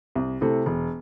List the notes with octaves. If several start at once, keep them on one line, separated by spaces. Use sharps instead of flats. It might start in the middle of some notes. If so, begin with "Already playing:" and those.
C2
C3 A3 E4 A4
E1